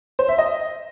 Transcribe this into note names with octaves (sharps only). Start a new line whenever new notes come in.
C5
E5
D#5